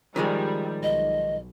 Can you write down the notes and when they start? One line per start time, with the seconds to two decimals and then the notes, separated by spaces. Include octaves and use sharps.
0.16 D#3 F3 G3 G#3
0.83 B1 D#5